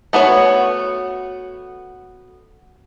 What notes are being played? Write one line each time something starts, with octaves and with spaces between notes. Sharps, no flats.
A3 B3 F#4 C#5